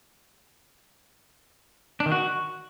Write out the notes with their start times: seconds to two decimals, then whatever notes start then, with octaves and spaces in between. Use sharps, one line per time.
2.00 D4
2.06 D#3
2.12 F#4